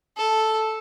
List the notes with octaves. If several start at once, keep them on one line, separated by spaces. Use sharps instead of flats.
A4